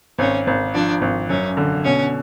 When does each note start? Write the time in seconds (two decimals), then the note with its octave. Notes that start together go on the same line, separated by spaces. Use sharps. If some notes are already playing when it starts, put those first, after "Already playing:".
0.19 G#1 C#4
0.47 G#1
0.74 F3 D4
1.02 G#1
1.29 F#2 C#4
1.57 D3
1.85 B2 C#4